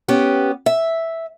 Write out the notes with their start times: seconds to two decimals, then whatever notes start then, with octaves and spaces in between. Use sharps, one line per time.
0.08 B3 C#4 G4
0.66 E5